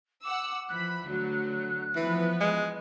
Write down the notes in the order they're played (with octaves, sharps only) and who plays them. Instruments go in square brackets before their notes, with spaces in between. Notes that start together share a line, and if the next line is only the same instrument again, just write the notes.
[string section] F#5 E6 [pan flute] D6
[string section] E3 F3 B5 [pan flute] F#6
[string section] D2 D3 F#3
[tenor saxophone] E3 [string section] F3 B3 B4
[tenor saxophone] G#3